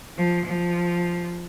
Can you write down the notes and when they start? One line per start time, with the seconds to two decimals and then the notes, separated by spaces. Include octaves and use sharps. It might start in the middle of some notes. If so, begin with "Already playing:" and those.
0.17 F3
0.45 F3